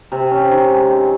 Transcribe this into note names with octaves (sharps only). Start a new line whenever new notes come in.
C3
C#4
D#3
G#3
C3